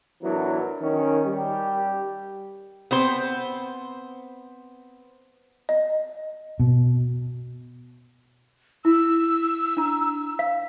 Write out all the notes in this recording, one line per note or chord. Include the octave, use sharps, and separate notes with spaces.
A1 E3 F#3 B3 D4 A#4
D#3 C#4
G3 G4
B3 C4 C5
D#5
B2
E4 E6
D4 A#5
F5